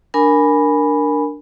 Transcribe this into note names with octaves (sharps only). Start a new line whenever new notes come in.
D4 A#4 G#5 B5